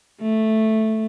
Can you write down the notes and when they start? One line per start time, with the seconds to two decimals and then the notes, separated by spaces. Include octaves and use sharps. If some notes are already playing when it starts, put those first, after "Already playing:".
0.22 A3